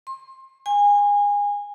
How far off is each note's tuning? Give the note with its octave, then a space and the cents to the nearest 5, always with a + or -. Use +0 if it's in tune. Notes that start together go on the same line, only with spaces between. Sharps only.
C6 +25
G#5 -25